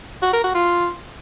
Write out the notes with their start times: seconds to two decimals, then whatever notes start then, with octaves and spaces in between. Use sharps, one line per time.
0.22 F#4
0.33 A#4
0.44 F#4
0.55 F4